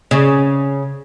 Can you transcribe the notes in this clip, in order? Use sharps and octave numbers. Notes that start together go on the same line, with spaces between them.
C#3